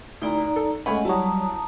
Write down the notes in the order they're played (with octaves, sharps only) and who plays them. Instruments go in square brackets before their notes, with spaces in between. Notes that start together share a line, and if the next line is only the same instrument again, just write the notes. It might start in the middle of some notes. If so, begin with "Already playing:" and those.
[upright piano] D2 E4 G7 [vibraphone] D#4 D5 A#5
[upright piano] A4
[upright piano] C#2 C#5 B5 [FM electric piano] A3 C#4 [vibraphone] D#5 F#5 G#5
[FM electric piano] F#3 G3 C#5 [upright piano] E4 F#4 [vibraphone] A5 A#5 D#6